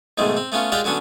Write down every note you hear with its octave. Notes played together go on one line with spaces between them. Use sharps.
B1 G#2 D#3 G#3 A3
C4
A3 B3 C#4 F4
G#3 F4 G4 A#4 D5 F#5
D3 F#3 B3 C#4 D4